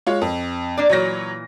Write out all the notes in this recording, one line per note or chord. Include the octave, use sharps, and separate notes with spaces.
G#3 F4 C#5
F2
A#3 D4 D5
A#2 E3 F#3 C#5 A#6